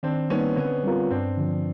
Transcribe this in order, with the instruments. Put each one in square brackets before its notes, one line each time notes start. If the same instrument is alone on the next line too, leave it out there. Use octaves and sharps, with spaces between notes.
[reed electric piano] D#3 [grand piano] C4 D4
[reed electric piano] G3 A#3 D#4 [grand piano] B3 C#4
[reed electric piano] D3 [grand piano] B3 C#4
[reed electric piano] G3 C4 F4 A#4
[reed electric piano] G2 [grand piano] C4 D4
[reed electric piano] D3 F3